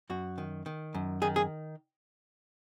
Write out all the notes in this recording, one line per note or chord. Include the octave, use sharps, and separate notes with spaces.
F#2 F#4
D#3
D#3
F#2
D#3 G#4
G#4